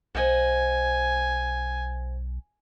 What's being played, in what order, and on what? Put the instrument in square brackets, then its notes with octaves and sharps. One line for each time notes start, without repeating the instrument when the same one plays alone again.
[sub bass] B1 [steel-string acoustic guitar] C5 D#5 F#5 [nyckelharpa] G#5